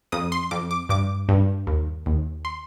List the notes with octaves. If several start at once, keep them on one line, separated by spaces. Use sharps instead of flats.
F2 D#6
C6
F2 D6
D6
G2 D6
G2
D#2
D#2
C6